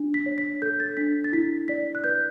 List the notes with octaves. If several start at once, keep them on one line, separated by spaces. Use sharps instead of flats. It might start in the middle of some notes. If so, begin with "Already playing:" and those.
Already playing: D4
B6
C#5
B6
A4 G6
A6
D4 B6
A6
E4 B6
D5 B6
F#6
B4 G6